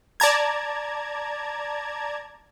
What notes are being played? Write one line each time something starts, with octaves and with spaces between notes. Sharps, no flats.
D5 A5 A#5 G#6